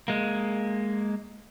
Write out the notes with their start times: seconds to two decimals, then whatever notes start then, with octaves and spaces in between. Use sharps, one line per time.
0.08 G#3 A#3